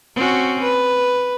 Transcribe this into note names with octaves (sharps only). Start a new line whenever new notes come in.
C4 C#4 F#4
B4